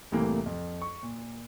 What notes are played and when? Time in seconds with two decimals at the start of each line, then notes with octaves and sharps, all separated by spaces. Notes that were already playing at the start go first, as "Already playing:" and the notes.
0.12 C2 A2 C3 E3 A#3
0.46 F2
0.82 C#6
1.03 A#2